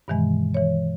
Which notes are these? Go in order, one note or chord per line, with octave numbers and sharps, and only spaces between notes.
G2 B2 D#3 E3 G#3
E3 C#5